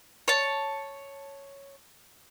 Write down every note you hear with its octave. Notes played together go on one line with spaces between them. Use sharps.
C#5 A5